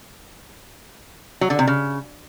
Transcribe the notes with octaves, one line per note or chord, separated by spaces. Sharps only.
F#3
D3
C3
C#3